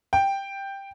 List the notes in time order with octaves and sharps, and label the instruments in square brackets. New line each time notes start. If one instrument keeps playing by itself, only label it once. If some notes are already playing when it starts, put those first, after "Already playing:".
[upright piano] G5